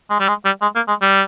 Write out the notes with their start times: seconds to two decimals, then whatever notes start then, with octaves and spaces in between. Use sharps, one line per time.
0.10 G#3
0.20 G3
0.28 G#3
0.45 G3
0.62 G#3
0.75 A#3
0.88 G#3
1.02 G3